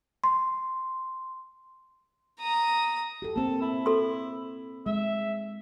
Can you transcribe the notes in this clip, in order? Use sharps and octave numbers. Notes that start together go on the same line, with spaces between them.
C6
A#5 D#6
G4 A4
A#3 C4 A4
E4
A4 C6
G#3 E5